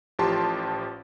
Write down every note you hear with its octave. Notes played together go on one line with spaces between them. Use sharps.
A1 A2 F3 G4 A5 C6